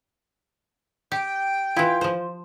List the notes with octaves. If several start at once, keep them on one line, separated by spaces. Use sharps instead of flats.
G4 G5
E3 E4 F4
F3 C5